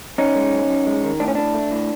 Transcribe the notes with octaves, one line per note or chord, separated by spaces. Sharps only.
F#2 C#4 D#4
G#3
F#2
F#2
G#3
D#3
A2 D4
C#4
A2 D4
A3
A2